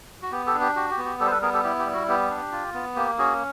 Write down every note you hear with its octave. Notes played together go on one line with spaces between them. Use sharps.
F#4
B3 G4
G4 A4
D4
G4
F#4 G4
G4
B3
G4
G3 G4 A4
C5
A4 B4
B3 G#4 A#4
G4 A4
E4 G4
G4
G3
F#4
B3 G4
D4
F4
B3
A#3 G4
C#4 F#4 G#4